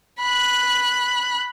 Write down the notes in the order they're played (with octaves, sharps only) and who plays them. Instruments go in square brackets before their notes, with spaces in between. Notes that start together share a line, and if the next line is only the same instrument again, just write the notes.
[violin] B5 F#6